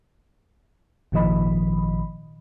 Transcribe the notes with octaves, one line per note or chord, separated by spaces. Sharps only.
G#1 A#2 D#3 F3 D#5 B5